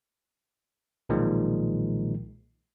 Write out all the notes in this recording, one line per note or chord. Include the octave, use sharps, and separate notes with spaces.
B1 A#2 D#3 F3 G#3